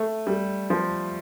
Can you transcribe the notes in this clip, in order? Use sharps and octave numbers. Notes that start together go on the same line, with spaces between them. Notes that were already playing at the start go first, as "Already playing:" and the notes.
Already playing: A3
G3
F3